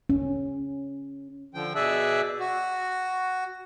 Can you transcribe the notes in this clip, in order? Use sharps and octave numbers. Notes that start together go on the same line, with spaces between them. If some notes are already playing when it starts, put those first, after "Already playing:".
C#4
D3 F3 G5
B2 G#4 D5 E5 E6 F#6
F#4